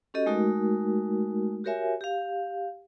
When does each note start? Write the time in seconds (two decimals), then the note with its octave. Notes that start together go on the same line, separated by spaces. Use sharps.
0.14 C#4 F#4 G4 A4 D#5
0.26 G#3 A3 D#4 F#4 A#4
1.64 F#4 G4 A#4 C#5 E5 G#5
2.01 G4 F5